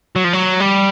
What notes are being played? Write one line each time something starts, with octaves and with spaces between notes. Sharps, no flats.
F#3
F3
F#3
G3